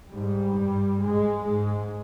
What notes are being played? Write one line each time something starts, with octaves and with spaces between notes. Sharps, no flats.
G#2 G3
G2
G#2 G#3
G#2 G#3